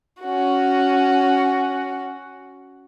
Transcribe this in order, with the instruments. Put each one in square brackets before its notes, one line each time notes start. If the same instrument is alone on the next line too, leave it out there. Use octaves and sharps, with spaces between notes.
[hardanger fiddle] C#4 F#4